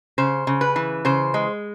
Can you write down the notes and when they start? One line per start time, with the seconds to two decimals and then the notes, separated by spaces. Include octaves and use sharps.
0.18 C#3 C5
0.47 C#3
0.61 B4
0.76 E3
1.05 C#3 C5
1.34 G#3